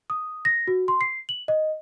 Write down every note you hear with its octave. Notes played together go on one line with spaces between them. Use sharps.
D#6
A#6
F#4
C6
C7
F#7
D#5